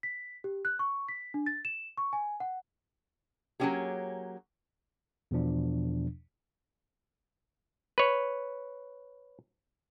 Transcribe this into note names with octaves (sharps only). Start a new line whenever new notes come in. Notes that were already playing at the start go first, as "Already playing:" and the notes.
B6
G4
F#6
C#6
B6
D4
A6
E7
C#6
G#5
F#5
F#3 A#3 C4 C#4 G4 G#4
E2 B2 F3 D4
B4 C#5